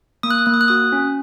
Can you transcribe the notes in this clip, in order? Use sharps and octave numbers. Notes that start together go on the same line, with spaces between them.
A#3 D#6
F#6
D#6
A#3 F#6
D#6
F#6
F#4 D#6
C#4